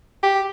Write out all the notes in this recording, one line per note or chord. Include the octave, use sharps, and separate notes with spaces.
G4